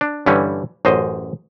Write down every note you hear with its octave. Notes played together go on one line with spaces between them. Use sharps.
D4
G2 D3 E3 G3 C#4
A1 F#2 C5 D#5